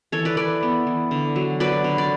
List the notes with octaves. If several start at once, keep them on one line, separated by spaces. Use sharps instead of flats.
E3 A4 C#5
B4 D5
E3 B4 D5
B3
E3
D3
F#3
F#3 B4 D5
D3
D5